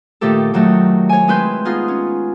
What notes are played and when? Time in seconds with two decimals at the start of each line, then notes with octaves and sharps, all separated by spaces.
0.21 A#2 D#3 A3 G4 A4
0.54 D#3 F#3 A3
1.09 C#5 G#5
1.28 G#3 C4 E4 B4 C6 G6
1.65 B3 D#4 F4 G#4 F6
1.88 C#4